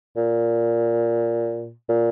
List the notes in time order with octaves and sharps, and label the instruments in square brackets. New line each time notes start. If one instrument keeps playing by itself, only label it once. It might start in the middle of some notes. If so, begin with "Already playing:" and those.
[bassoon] A#2
A#2